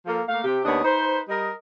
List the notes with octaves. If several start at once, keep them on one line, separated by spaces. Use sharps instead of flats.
F3 A#3 F4 A4
A3 A#3 F5
C3 G4
D#2 B3 D4 C#5 D#5
D#4 B4 C5
G3 A#4 D#5